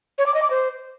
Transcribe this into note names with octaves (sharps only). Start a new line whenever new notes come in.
C#5
D6
D#5
D6
C5